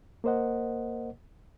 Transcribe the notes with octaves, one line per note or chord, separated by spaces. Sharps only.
A#3 A#4 C5 D#5 F#5